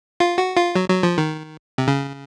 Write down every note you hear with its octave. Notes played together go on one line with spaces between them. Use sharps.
F4
F#4
F4
F#3
F#3
F3
D#3
C3
C#3